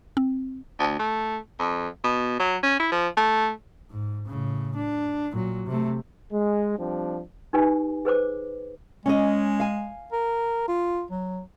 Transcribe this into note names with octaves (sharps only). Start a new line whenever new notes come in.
C4
D2
A3
F2
B2
F#3
C#4
E4
F3
A3
G#2
A2 C#3
D4
A#2 F#3
C3 A3
G#3
F3 G3 C4 D4
D#4 G4 B4 G#5
G#4 B4 C5 D6
G#3 C#4 D#5
F5 G#5
A#4
F4
F#3